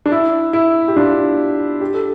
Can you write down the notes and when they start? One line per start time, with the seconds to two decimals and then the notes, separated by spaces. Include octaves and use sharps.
0.06 D4
0.12 E4
0.53 E4
0.88 G4
0.96 D4 F4
1.81 G4
1.94 A4